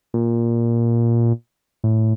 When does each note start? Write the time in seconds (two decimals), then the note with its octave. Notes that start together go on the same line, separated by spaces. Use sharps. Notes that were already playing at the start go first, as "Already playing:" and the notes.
0.14 A#2
1.84 A2